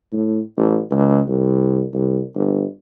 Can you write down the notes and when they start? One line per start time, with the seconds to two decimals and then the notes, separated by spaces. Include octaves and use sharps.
0.12 A2
0.57 A1
0.91 C#2
1.28 C2
1.93 C2
2.35 G1